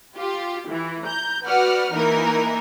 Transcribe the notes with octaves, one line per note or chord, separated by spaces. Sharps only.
F4 G4
E3
A#5 G6
F#4 B4 D5 F#5 F6
E3 A#3 D#4 A#4